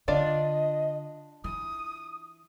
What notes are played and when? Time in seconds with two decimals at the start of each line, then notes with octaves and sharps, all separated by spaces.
0.08 D3 D4 F4 D5 D#5
1.44 E3 D#6